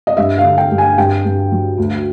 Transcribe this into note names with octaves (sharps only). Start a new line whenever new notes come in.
D#5
G2 E5
F5
D3
G5
G2
G#5
G2 G5
G2
F#3
D2